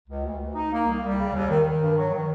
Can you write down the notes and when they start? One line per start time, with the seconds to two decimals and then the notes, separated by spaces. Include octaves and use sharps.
0.08 C#2
0.24 D2
0.39 D2
0.55 D#4
0.72 A#3
0.87 C2
1.03 G3
1.17 C#3
1.34 D#2
1.49 D#3
1.65 D#3
1.80 G2
1.97 F#3
2.13 D#3